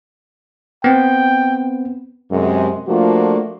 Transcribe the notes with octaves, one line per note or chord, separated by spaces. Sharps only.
B3 C4 G5
F#2 C3 G#3
F3 A3 A#3 D4 F4 F#4